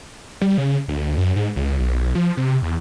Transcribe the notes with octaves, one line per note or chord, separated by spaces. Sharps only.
G3
C#3
D2
F#2
G#2
C#2
B1
F3
C3
E2